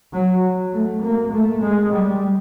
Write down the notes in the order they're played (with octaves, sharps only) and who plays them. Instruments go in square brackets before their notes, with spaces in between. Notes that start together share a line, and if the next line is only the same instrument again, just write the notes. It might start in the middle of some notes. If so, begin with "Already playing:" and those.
[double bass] F#3
A3
A#3
A3
G#3
G3